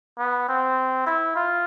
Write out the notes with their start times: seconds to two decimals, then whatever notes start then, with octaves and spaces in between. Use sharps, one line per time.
0.18 B3
0.48 C4
1.06 E4
1.36 F4